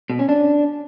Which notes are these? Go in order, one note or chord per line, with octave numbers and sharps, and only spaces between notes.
B2
C#4
D4